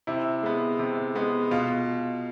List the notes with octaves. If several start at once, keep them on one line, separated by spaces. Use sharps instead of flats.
C3 E4
G#3 B3
C3
G#3 B3
B2 F4